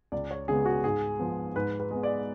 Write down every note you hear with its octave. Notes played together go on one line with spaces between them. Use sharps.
C#2 D5
C#5
C#3 G#3 B3 G#4
F#4
G#2 G#4
F3 B3
G#2 B4
B4
G#3 B3
D5